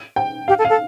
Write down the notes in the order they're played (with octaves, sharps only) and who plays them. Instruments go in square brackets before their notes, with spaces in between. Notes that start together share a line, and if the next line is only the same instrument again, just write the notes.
[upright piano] G5
[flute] G4 [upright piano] F5
[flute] A4
[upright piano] F5
[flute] A4